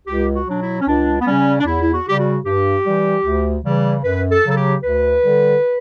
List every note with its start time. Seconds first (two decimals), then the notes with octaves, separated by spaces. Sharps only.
0.07 C#2 G4
0.34 F#4
0.47 B2 F#3 D4
0.61 E4
0.81 C#4
0.87 C#2 D4
1.20 B3
1.27 C#3 G3 C#4
1.60 D4
1.66 E2 E4
1.81 E4
1.93 F#4
2.06 C#3 G3 G4
2.19 F#4
2.45 G2 G4
2.86 E3 G3
3.25 D2
3.65 C#3 E3 G3
4.04 F#2 B4
4.31 A4
4.44 C#3 F#3
4.51 A4
4.57 G4
4.83 D2 B4
5.23 D3 G3